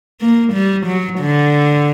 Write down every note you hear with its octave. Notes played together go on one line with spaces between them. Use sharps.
A#3
G3
F#3
D3